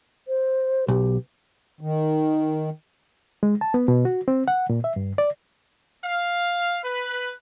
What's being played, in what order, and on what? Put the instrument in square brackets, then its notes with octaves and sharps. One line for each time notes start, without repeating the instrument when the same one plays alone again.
[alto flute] C5
[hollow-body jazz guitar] B1 [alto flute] G4
[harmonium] D#3
[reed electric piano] G#3
A5
B3
B2
F#4
C4
F#5
A#2
E5
G2
D5
[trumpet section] F5
B4